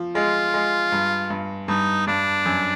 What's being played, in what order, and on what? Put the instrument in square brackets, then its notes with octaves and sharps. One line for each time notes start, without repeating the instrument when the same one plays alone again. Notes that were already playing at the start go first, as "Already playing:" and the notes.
Already playing: [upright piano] F3
[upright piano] G#3 [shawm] F4
[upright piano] G#3
G2
G2
[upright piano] G2 [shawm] D#4
[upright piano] G2 [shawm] D4
[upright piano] F#2